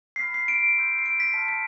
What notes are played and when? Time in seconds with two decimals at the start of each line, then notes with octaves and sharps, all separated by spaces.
0.16 C7
0.20 B5 F6 B6
0.34 C7
0.48 D7
0.78 C6 E6 G6
0.99 C7
1.06 D7
1.20 B6
1.34 A5 C6 F6
1.48 B6